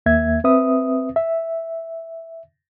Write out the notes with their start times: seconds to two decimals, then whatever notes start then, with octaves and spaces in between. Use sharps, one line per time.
0.06 D#2 A#3 E5 G#6
0.44 C4 B4 E5 D#6
1.16 E5